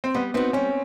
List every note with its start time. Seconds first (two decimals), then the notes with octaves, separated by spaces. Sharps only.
0.04 C4
0.14 G3 B3
0.34 B3 C4 D#4 F#4
0.53 G3 C#4